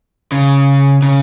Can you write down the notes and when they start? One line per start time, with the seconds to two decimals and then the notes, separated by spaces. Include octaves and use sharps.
0.32 C#3
1.02 C#3